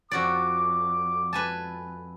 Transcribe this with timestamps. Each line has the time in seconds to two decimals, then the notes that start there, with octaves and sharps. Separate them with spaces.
0.11 F2 F#4 D5 D6
1.33 B4 G#5 A5